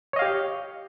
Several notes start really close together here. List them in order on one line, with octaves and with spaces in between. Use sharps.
C#5 D#5 F5 G4